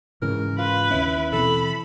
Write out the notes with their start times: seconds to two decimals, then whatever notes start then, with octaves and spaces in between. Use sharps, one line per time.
0.22 G#2 C#3 E3 A#4
0.58 F4 B4
0.91 D#2 C#4 E4
1.32 B2 E3 C4 A4 B5